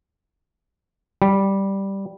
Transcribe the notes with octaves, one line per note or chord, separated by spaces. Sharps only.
G3